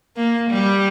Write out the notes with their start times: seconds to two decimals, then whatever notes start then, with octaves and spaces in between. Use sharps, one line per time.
0.16 A#3
0.50 G3